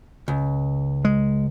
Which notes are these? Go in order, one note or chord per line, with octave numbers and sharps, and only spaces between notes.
C#2
G#3